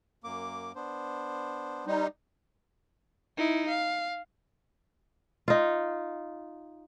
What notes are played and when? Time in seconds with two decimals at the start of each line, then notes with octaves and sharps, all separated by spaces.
0.24 F#2 A#3 D6
0.75 B3 D4 C5
1.87 G3 D#4 C5
3.37 D#4 E4
3.69 F5
5.48 D#4 F4